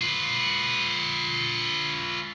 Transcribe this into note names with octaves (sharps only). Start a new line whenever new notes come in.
F4 B4